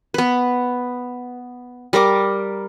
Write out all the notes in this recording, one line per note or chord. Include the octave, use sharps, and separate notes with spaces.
B3 B4
G3 A#4 A#5 D6